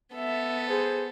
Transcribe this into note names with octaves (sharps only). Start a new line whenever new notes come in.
B3 A4 E5
G#4 C5